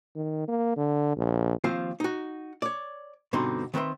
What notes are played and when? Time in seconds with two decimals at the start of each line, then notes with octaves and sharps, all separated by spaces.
0.16 D#3
0.48 A#3
0.76 D3
1.16 A#1
1.64 D#2 F3 C4 F4 F5
2.00 D#4 F#4
2.62 C#5 D5
3.33 G2 B2 D3 C4 D#4 C6
3.74 D#3 C4 B4 E5 C6